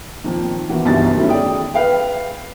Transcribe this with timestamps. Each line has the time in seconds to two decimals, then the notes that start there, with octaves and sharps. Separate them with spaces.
0.24 F2 A#2 D#3
0.69 B2 E3 A#3 F#4
0.85 G1 C2 E3 D#4 F#4 A6
1.16 D#3 F#3 A3 C#4 E4
1.29 G#4 D5 G5 D#6
1.74 B4 F5 G5